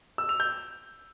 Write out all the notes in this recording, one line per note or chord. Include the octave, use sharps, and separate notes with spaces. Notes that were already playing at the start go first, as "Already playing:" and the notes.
E6
F7
G6